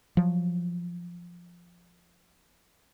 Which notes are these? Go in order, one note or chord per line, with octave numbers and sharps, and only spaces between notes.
F3 F#3